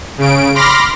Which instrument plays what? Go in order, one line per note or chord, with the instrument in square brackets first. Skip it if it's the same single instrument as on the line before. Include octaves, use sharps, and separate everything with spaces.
[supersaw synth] C#3 D7
B5 C6 D6 F6 A#6